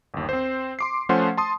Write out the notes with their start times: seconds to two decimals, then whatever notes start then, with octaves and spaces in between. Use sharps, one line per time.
0.14 G1 D#2
0.29 C4 C5
0.79 C6 D6 C7
1.09 F3 A3 C#4 C5 F#5 C6
1.37 A5 C6 D#6